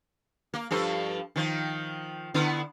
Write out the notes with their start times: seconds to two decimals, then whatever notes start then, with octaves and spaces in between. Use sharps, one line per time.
0.54 A#3
0.71 G2 F3 A4
1.36 D#3 F3
2.34 D3 B3 E4